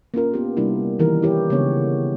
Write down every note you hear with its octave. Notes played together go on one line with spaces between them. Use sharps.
A#3 C#4 F4 A#4
B3 G4
C3 G3 A#3 D4 E4
D#3 E3 G3 D#4 G4 A#4
E4 G4 C#5
C#3 G#3 A#3 B3 D4 C#5